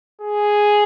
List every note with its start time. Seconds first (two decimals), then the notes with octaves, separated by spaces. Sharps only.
0.22 G#4